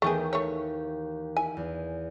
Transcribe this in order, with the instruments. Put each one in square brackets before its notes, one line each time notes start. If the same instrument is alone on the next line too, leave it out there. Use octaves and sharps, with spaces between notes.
[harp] D#2 E3 G5 [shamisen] A3 B3 G#4
[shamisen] A3 C#5
[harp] E4 [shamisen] G#5
[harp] E2